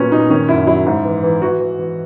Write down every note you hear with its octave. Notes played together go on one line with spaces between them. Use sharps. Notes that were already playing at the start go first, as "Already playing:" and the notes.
Already playing: A#2 F#3 B3 C#4
A#2 D#4
D#3 C#4
F#2 E4
F#3 E4
G#2
E3
E3
E3 F#4
E3
E3